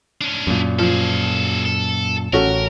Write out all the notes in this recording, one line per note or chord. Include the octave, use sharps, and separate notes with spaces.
C#4 D4
F#2 A#2
F3 G#4 A4
A4
A1 C#4 F#4 A4 A#4